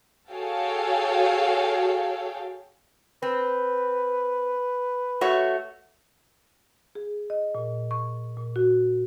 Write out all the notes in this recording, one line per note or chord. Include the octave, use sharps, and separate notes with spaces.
F#4 G#4 A4 C#5 F5 G5
C4 B4
A3 F#4 C#5
G#4
D#5
A#2
C#6
A#2
F#4